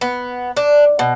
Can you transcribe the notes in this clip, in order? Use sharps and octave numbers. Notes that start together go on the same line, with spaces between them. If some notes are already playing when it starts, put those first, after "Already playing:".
B3
D4
B2